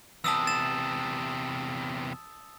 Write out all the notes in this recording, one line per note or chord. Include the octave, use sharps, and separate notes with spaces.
E2 C3 A5 D#6 E6
A6 E7